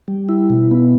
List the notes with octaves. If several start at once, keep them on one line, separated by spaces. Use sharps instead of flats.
G3
E4
B2
B3